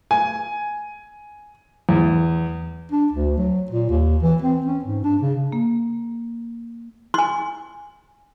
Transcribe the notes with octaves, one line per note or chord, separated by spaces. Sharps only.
G#5
E2
D4
D2
F#3
A#2
D#2
E3
C4
C#4
G#2
D4
C#3
A#3
G#5 C6